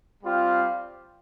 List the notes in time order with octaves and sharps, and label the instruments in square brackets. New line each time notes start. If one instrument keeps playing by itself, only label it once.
[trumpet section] G3 C4 F4